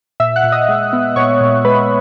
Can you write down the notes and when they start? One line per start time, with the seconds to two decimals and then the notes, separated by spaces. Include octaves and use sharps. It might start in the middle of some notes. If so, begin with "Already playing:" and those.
0.20 A#2 E5 E6
0.36 F#5 F#6
0.43 A#2
0.52 D#5 D#6
0.68 G#3
0.93 B3
1.16 A#2 C#5 C#6
1.41 A#2
1.65 G#3 B4 B5